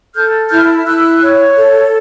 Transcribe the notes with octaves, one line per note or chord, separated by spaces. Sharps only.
A4 F6 G6
E4 F6 G6
E4 E6 F#6
C#5
A4